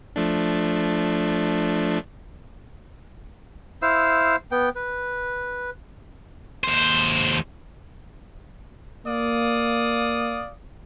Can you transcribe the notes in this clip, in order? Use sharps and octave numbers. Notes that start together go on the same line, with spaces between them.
F3 A3 D4
E4 C5 F5 E6
B3 G5
B4
D#2 C5
A#3 D5 F5 D#6